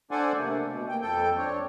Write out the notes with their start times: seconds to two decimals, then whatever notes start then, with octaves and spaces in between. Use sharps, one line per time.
0.11 D4 A4 C5 D5 F#5 G#5
0.37 C3 A3 A#3
0.69 B2
0.89 A#3 G5
1.01 F2 A4 G5
1.37 C4 D4 C#5